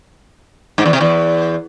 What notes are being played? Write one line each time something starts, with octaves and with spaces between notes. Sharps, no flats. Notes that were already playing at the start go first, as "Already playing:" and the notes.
G#2
E2
C3
E2